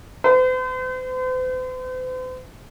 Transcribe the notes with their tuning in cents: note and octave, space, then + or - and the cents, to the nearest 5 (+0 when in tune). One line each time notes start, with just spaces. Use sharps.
C5 -45